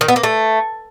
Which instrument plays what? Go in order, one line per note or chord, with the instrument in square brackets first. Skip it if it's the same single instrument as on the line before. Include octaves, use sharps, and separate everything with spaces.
[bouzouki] D#3
B3
A#3
A3